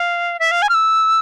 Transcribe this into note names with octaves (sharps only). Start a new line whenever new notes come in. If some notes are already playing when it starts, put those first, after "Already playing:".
Already playing: F5
E5
F5
G#5
F6
E6